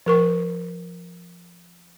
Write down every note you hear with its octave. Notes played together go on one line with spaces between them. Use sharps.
F3 A#4 C#6